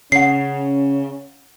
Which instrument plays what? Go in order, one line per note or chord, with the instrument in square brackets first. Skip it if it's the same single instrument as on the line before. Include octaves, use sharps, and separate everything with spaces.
[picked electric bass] C#3 [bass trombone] C#4 [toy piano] C#5 F#5 [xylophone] C7